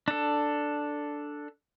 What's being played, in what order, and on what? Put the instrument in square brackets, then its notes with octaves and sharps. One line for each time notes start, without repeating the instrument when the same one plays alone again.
[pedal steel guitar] D4 A4